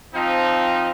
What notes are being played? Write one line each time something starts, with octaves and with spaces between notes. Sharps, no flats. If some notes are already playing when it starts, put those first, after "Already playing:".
F3 C4 D#4